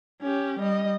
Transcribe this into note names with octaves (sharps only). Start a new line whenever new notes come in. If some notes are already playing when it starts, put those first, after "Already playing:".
C#4 G4
G3 D#5